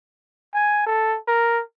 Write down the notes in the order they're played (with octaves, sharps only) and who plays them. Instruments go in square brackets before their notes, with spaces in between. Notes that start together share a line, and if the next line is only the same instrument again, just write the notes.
[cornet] G#5
A4
A#4